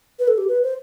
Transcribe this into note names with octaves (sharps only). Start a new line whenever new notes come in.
B4
A4
G4
B4
C5